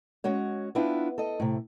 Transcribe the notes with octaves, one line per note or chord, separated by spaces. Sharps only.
G#3 C#4 F#4 C#5
B3 C4 D4 E4 F4
A4 D#5
A2 C3